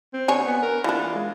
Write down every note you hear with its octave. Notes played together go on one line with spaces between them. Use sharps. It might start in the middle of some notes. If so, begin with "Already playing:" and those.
C4
D3 C#5 G#5
B3
A#4
E3 D4 F4
G#3